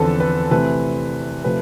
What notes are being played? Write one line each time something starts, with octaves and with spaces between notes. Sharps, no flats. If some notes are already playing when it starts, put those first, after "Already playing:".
Already playing: E2 D3 F3 C4 A4 B4
B4
C3 E3 A3 C4 B4
C3 F3 A3 B4